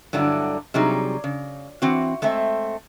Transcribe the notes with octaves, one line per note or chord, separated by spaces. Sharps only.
G2 D3 F#3 D4 E4
C3 F#3 G3 D#4 G#4
C#3
E3 C4 F#4
G#3 A3 C4 E5